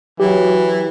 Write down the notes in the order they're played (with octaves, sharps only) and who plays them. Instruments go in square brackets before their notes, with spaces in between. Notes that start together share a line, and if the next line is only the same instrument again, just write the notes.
[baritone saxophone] E3 [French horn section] F#3 [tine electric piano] G4